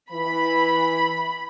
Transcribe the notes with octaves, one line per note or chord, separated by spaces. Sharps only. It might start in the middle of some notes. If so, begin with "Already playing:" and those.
E3 B5